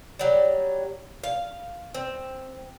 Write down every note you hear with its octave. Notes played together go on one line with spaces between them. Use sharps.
F#3 G3
F5
C4